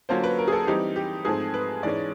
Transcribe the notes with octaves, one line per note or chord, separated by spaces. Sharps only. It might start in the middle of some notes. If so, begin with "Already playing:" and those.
D3 F#3 A#3 C#4 F4 C5
B4
A#4
G#4
A4
E3 G3 C4 D#4 G4
G4
G#2 F3 A3 C4 G#4
B4
G#2 E3 G#3 C#4 D5